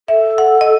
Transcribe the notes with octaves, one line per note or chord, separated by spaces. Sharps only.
A4 E5
F#5
D#5